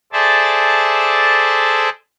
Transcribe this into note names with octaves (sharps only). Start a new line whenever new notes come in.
G#4 A4 C5 D5 E5 A5